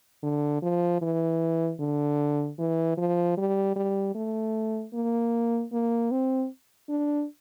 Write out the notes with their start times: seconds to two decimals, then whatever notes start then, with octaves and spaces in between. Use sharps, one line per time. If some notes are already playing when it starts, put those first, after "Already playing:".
0.23 D3
0.62 F3
1.02 E3
1.80 D3
2.59 E3
2.98 F3
3.37 G3
3.76 G3
4.15 A3
4.94 A#3
5.73 A#3
6.11 C4
6.89 D4